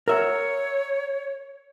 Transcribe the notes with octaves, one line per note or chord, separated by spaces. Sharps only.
A#4 C#5 E5 F#5